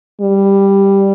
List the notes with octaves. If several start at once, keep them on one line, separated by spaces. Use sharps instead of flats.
G3